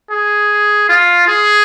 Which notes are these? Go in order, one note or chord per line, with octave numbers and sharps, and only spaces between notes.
G#4
F4
G#4